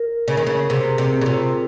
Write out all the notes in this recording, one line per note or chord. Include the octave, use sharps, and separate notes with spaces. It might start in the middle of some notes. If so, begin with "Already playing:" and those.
Already playing: A#4
C#3 G#4
D#3
C#3
C3 G#4
C3 G#4
C#3
C3 F4